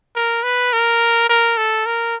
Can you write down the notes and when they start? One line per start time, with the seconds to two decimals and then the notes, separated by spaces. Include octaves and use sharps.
0.16 A#4
0.43 B4
0.73 A#4
1.29 A#4
1.57 A4
1.86 A#4